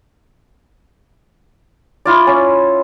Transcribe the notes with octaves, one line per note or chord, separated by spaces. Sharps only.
E4 F4 D5
C#4